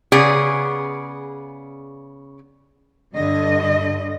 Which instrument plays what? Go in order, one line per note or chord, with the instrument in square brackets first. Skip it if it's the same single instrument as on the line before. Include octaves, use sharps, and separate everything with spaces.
[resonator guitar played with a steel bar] C#3 B3 G#4 D5
[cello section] G2 D3 D#5